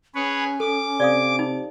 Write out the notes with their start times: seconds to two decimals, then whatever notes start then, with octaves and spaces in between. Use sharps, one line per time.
0.15 C#4 G#4 B4 C#5
0.60 A4 D6
1.00 C3 D5 F5 D#6
1.39 D#4